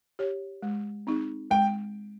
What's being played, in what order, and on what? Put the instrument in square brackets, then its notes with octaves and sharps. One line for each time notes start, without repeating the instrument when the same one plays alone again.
[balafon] G4 C#5
G#3
C4 D#4 G#4
[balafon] G#3 [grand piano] G5